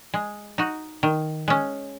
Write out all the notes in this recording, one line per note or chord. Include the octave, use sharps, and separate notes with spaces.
G#3
D#4 F#4
D#3
G#3 C#4